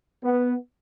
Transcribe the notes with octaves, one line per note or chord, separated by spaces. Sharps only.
B3